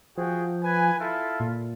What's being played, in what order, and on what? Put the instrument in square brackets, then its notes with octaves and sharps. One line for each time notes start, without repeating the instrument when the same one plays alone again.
[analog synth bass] F3 [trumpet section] F#4 G#4 G5
[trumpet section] B4 G#5
E4 F4 A4
[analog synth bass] A#2